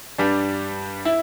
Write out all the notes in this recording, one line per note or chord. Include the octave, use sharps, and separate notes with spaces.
G2 G3 D4
E4